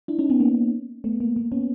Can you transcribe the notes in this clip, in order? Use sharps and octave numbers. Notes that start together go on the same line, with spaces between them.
D4 E4
C#4 D#4
B3 C#4
A#3
A3 B3
A#3
A#3
B3 C#4